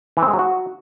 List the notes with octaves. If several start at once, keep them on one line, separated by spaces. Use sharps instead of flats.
E3
C4
G#3
F#3
F#4